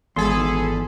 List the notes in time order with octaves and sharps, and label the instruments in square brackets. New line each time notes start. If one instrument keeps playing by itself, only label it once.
[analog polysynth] G#1 A4 B5 [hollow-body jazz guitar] E2 [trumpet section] G#4 [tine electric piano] C6